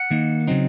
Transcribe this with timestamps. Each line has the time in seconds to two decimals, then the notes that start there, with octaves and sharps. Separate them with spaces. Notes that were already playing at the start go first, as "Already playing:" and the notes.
Already playing: F#5
0.11 D#3 A#3 D#4
0.47 C#3 F#3 C4 D#4